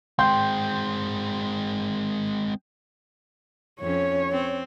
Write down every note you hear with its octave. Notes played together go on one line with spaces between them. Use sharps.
G#3 C4 G5 C6 G6
F2 C#4 C#5
C4